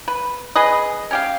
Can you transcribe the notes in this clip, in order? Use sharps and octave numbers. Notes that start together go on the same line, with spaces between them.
B4
G#4 B4 D#5
C#4 G4 F5